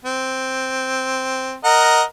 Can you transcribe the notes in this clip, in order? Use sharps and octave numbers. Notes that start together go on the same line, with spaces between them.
C4
A#4 D#5 F#5